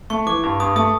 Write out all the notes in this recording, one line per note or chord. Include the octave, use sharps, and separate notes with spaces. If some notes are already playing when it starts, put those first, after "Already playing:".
A3 C#6
E3 D6
G2
G2 D#6
A3 D#6